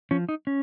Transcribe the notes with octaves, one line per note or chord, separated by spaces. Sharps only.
F3 C#4
D#4
C#4